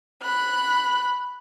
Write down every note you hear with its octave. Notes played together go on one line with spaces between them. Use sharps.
B5 F#6